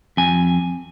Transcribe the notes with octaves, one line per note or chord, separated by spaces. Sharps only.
F2 G#5